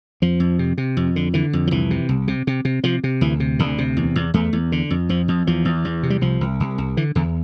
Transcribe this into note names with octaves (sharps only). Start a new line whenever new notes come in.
F2 F3
F2
C3
C3
F2
D3
D3 E3
F2
F3
C2 E3
C3
C2
C3
C3
C3
C3 F3
C3
D2 E3
C3
D2 D3
C3
E2
E2
E2 A3
E2
D3
F2
F2 F3
F2
E2 F3
E2
E2
C3
G3
C2 F3
C2
C2
C2
D3 E3
E2 D3